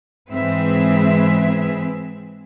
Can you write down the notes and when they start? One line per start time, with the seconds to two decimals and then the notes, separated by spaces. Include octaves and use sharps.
0.31 G#2 E3 C4 G#4 B4 E5